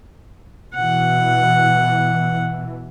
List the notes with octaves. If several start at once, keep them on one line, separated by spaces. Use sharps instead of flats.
B2 E3 F#5